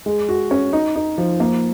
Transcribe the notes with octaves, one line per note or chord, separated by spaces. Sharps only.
G#3
F#4
C#4
D#4
D#4
F3
A#3